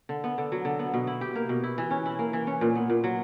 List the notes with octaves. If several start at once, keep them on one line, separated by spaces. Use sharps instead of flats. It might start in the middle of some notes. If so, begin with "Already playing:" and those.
D3
B3
D3
F#3
D3
B3
B2
E4
G4
A#3
B2
E4
E3
C#4
E4
A#3
E3
C#4
A#2
B3
A#2
F#3